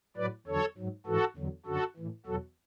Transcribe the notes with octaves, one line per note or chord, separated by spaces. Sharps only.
A2 F#3 B4 D5
E2 D3 F#3 A4 C#5
G#2 F#3
G#2 E3 F#4 A4
E2 D3 F#3
F#2 D3 F#3 F#4 A4
A2 E3
E2 B2 F#3 F#4 A4